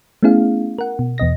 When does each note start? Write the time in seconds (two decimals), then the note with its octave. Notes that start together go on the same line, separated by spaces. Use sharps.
0.23 A3 B3 C#4 E4 G#4 F5
0.79 A#4 F#5
0.99 B2
1.18 E2 B2 D#5 A#6